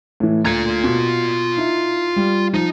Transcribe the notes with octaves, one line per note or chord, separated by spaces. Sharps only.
A2 E3
D2 F4 A#5 G#6
B2
D#4 E4
G3
F3 D#4